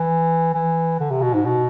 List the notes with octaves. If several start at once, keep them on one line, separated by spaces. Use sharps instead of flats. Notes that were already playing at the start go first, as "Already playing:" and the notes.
Already playing: E3
E3
D3
C3
B2
G#2
B2